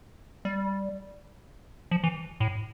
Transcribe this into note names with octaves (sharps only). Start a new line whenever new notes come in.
G3
F3
E3
A2